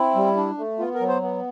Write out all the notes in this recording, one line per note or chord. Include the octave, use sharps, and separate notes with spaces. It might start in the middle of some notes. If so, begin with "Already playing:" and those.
Already playing: C4 E4
G3
D4
A3
B3 F4
A#4
F#3
C5
B3